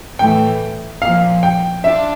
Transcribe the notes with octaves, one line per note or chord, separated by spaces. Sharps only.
A2 E3 A3 G5
A#2 F3 A#3 F5
G5
D4 F4 E5